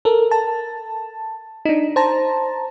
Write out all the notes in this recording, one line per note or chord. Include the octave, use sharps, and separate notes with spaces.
A4 A#4
A5
D4 D#4
C5 A5 A#5